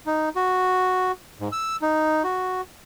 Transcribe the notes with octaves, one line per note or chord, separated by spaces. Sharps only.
D#4
F#4
G#2
E6
D#4
F#4